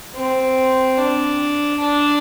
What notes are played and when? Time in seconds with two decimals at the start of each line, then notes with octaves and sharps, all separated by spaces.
0.15 C4
0.97 D4
1.81 D4